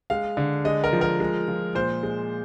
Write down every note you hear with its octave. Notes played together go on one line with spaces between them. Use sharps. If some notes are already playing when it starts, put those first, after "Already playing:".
G#3 F5
D3
G#3 D#5
A#4
F3
A#4
G#3
F3
A#2 C5
G#3